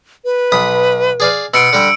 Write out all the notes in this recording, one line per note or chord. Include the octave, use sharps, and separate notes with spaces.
B4
B1 B5 D#6
G#4 D5 F5
B2 C6 E6 C#7 D7
D3 G3